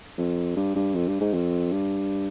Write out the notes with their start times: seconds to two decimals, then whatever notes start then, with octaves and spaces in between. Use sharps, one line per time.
0.18 F2
0.57 G2
0.76 G2
0.95 F2
1.08 G2
1.21 G#2
1.34 F2
1.72 G2